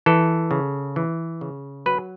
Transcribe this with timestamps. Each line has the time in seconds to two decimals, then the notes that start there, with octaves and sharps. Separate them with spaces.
0.06 E3 A4
0.51 C#3
0.96 E3
1.41 C#3
1.86 F#3 B4